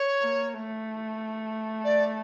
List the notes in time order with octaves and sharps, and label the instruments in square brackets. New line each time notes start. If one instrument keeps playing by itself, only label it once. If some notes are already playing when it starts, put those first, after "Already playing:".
Already playing: [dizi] C#5
[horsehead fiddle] A#3
A3
[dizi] D5